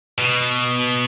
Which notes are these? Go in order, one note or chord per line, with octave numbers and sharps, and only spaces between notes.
B2